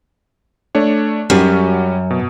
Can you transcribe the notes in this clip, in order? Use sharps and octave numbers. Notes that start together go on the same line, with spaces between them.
A3 D4 C#5
F#2 G3 C#4 F#4
B2